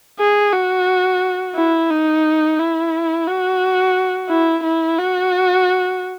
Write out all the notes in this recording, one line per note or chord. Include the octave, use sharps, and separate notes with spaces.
G#4
F#4
E4
D#4
E4
F#4
E4
E4
F#4